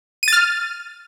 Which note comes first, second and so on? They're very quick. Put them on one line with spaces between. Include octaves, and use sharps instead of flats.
D#7 A6 F6